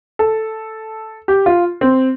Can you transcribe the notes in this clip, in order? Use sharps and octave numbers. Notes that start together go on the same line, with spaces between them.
A4
G4
F4
C4